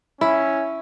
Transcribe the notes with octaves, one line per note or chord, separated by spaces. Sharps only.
C#4 E4